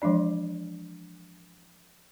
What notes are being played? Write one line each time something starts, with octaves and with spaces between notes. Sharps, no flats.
E3 F3 G#3 D4 D5